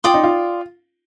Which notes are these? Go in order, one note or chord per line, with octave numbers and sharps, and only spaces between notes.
F4 D5 G5 C6 D#6
D#4
F4